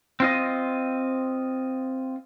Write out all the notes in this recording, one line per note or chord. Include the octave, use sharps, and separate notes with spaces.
C4 F4 D#5